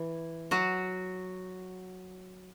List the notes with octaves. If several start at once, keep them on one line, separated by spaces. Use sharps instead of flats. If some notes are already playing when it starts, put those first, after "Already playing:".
Already playing: E3
F#3 F#4